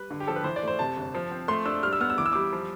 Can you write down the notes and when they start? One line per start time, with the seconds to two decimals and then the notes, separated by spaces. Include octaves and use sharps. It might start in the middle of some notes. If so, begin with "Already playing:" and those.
Already playing: G3 B4
0.11 D3
0.20 G4
0.27 F3 A4
0.36 B4
0.44 E3 C5
0.56 D5
0.63 A3 C5
0.79 C3 A5
0.97 G1
1.15 F3
1.31 C4
1.48 A3 C6
1.65 D4 E6
1.83 G3 F6
1.93 E6
2.00 B3 F6
2.10 E6
2.18 E3 D6
2.26 E6
2.33 G3 D6
2.53 F3